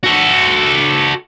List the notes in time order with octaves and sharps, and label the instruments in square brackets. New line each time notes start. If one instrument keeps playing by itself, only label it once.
[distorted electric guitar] F#4 A4